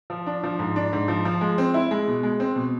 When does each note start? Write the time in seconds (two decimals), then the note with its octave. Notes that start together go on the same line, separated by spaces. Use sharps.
0.10 F3
0.26 D4
0.43 F3
0.59 G#2
0.76 D4
0.93 G#2
1.08 F3
1.25 F3
1.41 G#3
1.58 C4
1.74 E4
1.91 G#3
2.08 B2
2.23 G#3
2.40 C4
2.56 B2